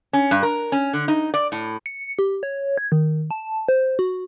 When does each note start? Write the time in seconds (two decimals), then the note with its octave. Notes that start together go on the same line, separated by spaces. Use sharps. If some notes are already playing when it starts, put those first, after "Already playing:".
0.13 C#4
0.31 G2
0.43 A#4
0.72 C#4
0.93 D3
1.08 D#4
1.34 D5
1.52 A2
1.86 C#7
2.19 G4
2.43 C#5
2.78 G#6
2.92 D#3
3.31 A5
3.69 C5
3.99 F#4